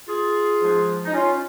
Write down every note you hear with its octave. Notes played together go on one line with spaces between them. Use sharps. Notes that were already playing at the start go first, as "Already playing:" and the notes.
F4 G#4
G#2 F3 G#3
D#4
C#4 F4